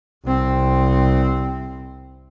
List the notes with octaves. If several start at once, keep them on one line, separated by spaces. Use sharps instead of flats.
C2 C4